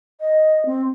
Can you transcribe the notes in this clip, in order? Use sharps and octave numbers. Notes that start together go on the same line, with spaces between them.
D#5
C4